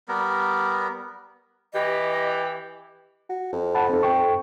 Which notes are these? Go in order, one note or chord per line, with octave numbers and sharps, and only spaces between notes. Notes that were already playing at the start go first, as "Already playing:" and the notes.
G3 B3 A#4
E3 G4 D#5
F#4
F2
F#5 A5 B5
C4 D#4 A4
A4 G5 C#6